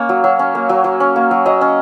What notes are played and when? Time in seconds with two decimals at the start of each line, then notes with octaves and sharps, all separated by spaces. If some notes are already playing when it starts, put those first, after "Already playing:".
Already playing: A#3 C#4 C#5
0.09 F#3
0.24 F#3
0.39 C#4
0.55 A#3
0.69 F#3
0.84 F#3
1.00 C#4
1.16 A#3
1.31 F#3
1.46 F#3 D#5
1.61 C#4